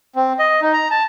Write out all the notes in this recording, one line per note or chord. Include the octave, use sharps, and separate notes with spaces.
C4
D#5
D#4
A#5
A5